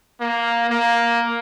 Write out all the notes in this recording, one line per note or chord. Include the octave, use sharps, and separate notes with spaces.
A#3
A#3